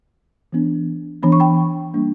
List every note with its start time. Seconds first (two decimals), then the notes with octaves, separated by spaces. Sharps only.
0.52 E3 B3 D4
1.23 E3 B3 D4 B5
1.32 C#6
1.40 G5 B5
1.94 G3 A#3 D4